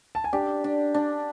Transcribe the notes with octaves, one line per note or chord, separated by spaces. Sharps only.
A5
G#5
D4 G4 G5
D4
D4